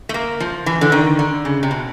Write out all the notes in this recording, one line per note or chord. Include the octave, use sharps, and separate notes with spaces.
A3
A#3
F3
E3
D3
D#3
D3
C#3
C3
B2